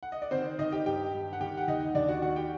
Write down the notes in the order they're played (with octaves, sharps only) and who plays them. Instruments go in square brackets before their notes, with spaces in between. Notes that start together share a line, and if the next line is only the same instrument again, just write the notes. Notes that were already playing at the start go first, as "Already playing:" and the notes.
[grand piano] F#5
D#5
D5
D#3 C4 C5
D#3 D#4 D#5
G4 G5
G2 G4 G5
G2
F#5
D#3 G4 G5
F#5
D#2 D#4 D#5
D#2 D4 D5
F#4 F#5
D#3 F#4 F#5
G4 G5